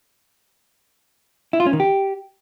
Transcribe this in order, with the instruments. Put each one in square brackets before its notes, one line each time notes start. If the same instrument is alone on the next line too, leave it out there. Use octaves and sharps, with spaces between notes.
[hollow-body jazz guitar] E4
F4
C#4
D#3
G4